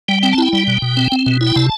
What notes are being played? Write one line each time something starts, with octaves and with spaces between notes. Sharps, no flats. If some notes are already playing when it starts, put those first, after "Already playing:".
G3 G5
C4 G5
A5
E4 G5
G3
B2
B2
C4
C4
B2
E4
G5
C3 A5